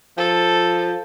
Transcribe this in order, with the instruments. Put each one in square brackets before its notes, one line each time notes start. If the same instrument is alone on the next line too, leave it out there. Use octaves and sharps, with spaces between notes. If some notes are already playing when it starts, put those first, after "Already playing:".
[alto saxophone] F3 [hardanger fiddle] A4